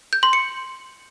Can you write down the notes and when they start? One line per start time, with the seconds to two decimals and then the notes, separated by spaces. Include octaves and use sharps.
0.13 G6
0.23 C6
0.33 C#7